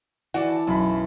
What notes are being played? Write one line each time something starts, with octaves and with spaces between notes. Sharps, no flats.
E3 F#4 D5
A5
B1 F#2 B5